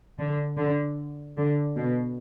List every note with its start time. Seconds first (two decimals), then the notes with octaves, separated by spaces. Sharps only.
0.19 D3
0.57 D3
1.37 D3
1.76 B2